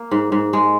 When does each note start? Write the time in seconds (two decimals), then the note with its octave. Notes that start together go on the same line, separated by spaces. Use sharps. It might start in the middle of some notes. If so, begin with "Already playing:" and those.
Already playing: A#3
0.11 G#2
0.32 G#2
0.53 G#3